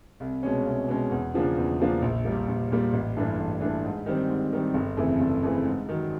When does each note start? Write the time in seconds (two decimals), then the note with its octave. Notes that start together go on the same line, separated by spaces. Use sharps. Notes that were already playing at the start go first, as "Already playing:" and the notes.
0.20 C2
0.43 B2 G#3 C#4
0.66 C2
0.88 B2 G#3 C#4
1.11 E2
1.34 C#3 F3 A#3 D4
1.58 E2
1.80 C#3 F3 A#3 D4
2.02 A#1
2.25 A#2 G3 A#3
2.48 A#1
2.71 A#2 G3 A#3
2.93 A1
3.17 G2 E3 A3 D4
3.38 A1
3.61 G2 E3 A3 D4
3.85 G#2
4.06 D#3 G3 C4
4.29 G#2
4.53 D#3 G3 C4
4.74 G1
4.97 F2 C#3 E3 A3
5.21 G1
5.42 F2 C#3 E3 A3
5.65 G#2
5.89 D#3 F#3